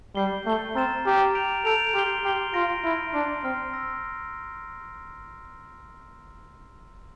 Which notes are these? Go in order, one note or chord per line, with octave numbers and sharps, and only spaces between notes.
G3 G6 C7 G7
A3 G6 C7 G7
C4 A#5 F6 A6 E7
G4 A#5 F6 A6 E7
G6 D7 F7
A4 G6 D7 F7
G4 C6 F6 C7 G7
G4 C6 F6 C7 G7
F4 C6 F6 A#6 D7
E4 C6 F6 A#6 D7
D4 C6 F6 C7
C4 C6 F6 C7
E6 A#6